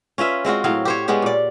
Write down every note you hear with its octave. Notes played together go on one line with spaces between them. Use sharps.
C#4 F4 B4 E5
G#3 C4 F4 F#4
A2 F#3 C4 F5
G4 C5 C#5
G#3 B3 C#4 G4
A#2 D5